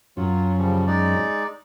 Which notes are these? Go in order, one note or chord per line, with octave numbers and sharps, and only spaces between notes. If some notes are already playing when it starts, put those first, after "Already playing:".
F#2 F#3 C#4 F4
C#3 F3 G3
G#3 D#4 D5